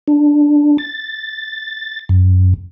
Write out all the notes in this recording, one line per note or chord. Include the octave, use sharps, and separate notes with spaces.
D4
A6
F#2